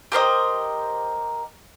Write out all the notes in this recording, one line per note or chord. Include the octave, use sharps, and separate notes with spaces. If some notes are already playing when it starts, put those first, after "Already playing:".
G4 A#4 C5 D#5